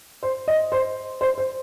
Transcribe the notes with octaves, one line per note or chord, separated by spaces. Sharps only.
C5
D#5
C5
C5
C5